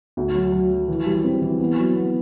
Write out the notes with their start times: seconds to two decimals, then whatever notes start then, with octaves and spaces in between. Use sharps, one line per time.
0.17 D2
0.35 F#3
0.52 F#3
0.71 F#3
0.88 E3
1.06 G3
1.24 C4
1.42 E3
1.59 B3
1.78 F#3
1.96 B3